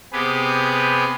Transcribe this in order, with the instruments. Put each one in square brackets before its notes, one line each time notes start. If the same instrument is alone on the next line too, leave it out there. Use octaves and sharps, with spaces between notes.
[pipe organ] C3 B3 G4 G#4 B4